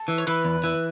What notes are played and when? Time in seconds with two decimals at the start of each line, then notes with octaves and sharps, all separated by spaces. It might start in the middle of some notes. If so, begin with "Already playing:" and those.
Already playing: A4
0.08 E3
0.18 C#5
0.27 E3 B4
0.45 E2
0.64 E3